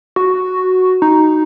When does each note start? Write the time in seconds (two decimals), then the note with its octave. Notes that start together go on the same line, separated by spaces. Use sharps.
0.16 F#4
1.02 D#4